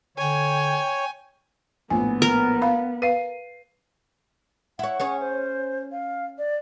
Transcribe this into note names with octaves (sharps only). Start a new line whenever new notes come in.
D3 C#5 G5 G#5
A#1 A2 B3 G#5
A#4
F5 B5
B4 F5 C7 D#7
E4 C#5 F#5
C#4 G#4 C#5
C5
F5
D5